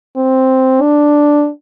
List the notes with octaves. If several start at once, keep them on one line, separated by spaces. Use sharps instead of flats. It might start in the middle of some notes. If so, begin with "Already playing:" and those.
C4
D4